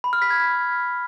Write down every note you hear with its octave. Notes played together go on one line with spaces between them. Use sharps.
B5
F6
B6
G#6